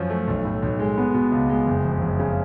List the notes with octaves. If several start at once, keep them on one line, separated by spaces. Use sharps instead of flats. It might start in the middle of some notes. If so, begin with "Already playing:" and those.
Already playing: F#2 F3 C#4
A3
B1
A2
B1
G#3
B3
B2
C#2
G#3
F#1
F2
F#1
C#3